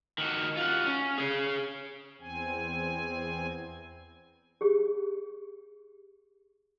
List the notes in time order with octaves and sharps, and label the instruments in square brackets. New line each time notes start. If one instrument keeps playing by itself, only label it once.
[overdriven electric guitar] D#3 F#4
F4 F#5
C#4
G#4 C#5
[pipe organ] E2 C4 G#5
[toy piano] G4 G#4